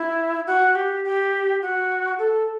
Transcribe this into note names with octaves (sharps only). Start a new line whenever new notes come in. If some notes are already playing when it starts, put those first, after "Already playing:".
Already playing: E4
F#4
G4
G4
F#4
A4